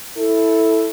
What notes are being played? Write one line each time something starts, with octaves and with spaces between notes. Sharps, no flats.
E4 A4